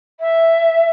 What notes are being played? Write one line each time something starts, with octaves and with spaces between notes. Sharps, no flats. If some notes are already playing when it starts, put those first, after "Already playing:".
E5